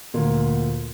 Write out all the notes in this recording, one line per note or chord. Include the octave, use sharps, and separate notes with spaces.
D2 A#2